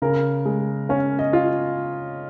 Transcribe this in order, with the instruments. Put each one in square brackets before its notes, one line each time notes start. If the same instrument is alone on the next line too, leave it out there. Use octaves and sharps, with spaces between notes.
[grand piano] C#3 [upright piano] A#4
[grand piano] G#3
[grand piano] C#4 [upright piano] C#5
[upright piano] D#5
[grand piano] F4